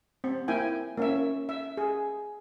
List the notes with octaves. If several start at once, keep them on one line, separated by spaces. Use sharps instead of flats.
C4
A#3 E4 G5 G#5
A#3 C#4 E5
E5
G#4